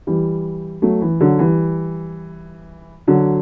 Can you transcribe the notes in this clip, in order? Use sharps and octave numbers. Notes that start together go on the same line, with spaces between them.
E3 G3
F#3 A3
E3
D3 F#3
E3 G3
D3 F#3